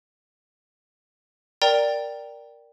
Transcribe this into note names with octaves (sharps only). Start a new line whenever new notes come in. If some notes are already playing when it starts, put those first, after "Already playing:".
A#4 D5 G5 A#5